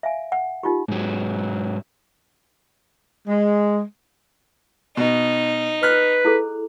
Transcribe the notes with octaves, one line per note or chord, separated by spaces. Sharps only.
E5 F5 G#5
F#5
D#4 F4 G4
G#2 F#3
G#3
B2 D#4
B4 F6 F#6
E4 G#4 A4